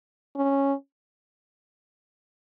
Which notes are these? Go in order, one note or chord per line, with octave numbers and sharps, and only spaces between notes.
C#4